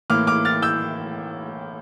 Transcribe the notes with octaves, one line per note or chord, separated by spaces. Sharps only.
A2 E3 A#3 D6 F6
D6 F6
F6 A6
E6 G6